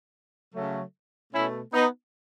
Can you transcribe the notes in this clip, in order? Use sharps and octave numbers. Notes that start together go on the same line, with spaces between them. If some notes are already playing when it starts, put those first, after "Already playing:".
C#3 F#3 A3
B2 A3 C#4 E4
B3 D#4